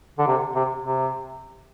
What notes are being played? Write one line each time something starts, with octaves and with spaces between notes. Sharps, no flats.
D3
C3
C3
C3